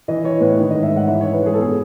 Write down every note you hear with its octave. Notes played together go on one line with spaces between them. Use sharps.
E3 D#5
E3 C#5
A2 B4
D#3 C#5
D#5
G#2
E5
G#2 F#5
E3 E5
C#5
E3
B4
G#2 G#4
A4
B2 G#4